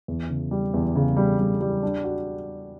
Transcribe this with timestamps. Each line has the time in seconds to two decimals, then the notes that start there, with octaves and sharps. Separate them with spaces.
0.08 E2
0.30 C#3
0.51 G3
0.74 E2
0.96 C#3
1.17 G3
1.39 G3
1.61 G3
1.83 D4
2.04 F#4